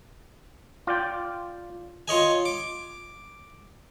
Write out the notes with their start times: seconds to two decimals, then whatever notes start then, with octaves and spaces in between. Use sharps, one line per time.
0.87 F4 D5 G5
2.08 F4 C#5 D#5 G#5
2.45 D6